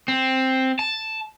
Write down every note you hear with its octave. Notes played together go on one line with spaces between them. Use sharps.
C4
A5